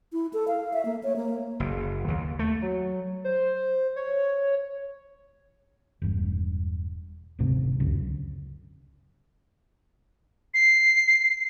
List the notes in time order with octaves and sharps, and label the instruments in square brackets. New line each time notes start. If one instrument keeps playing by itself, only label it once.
[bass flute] E4
A4
F5
E5
A#3
C#5
A#3
[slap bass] F#1
D#2
A3
[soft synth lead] F#3
C5
C#5
[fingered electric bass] E1 G2
F1 D2 G#2 C3
D#1 C#2 F#2 D3
[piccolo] C7